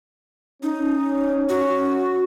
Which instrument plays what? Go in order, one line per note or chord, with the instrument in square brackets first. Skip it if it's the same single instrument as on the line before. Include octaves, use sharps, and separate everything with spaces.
[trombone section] C#4 [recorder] D#4
[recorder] F#4